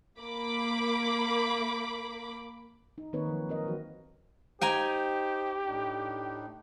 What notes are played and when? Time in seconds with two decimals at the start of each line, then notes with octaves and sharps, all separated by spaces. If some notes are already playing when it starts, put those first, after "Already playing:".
0.20 A#3 B5 D6
2.98 D#4
3.13 D#3 A#3 C4 D#4 B4 C#5
3.27 F3 F#3
3.49 C4 A#4 D#5
3.65 E3 F#3 F#4
4.61 D#4 G4 C5 G5 G#5 A#5
5.66 A2 D4 D#4